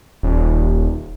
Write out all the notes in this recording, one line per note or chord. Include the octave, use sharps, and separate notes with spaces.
D#1